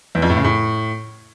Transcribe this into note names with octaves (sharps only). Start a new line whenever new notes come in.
E2
F2
A2
C#3
A2